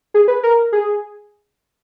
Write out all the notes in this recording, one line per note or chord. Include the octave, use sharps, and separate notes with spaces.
G#4
B4
A#4
G#4